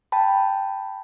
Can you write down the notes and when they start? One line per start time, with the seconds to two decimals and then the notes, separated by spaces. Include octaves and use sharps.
0.12 G5 A5 B5